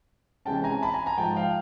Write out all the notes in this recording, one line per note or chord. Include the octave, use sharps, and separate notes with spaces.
C3 E3 G#3 C#4 G5 A5
G#5 A#5
A5 B5
G#5 A#5
G#5 A#5
G#2 F3 G#3 G5 A5
F5 G5